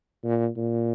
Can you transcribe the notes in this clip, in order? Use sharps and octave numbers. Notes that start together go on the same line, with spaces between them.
A#2
A#2